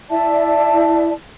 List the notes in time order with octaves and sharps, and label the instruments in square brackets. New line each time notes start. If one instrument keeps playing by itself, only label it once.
[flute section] E4 D5 E5 A5